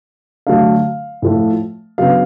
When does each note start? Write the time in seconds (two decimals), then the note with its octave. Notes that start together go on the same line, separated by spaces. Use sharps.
0.47 D3 F#3 A3 D4 F5
1.22 A2 F3 A3
1.98 C#3 F#3 B3 D4 F5